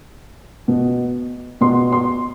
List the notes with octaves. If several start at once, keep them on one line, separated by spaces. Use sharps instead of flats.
B2
B2 C6
C6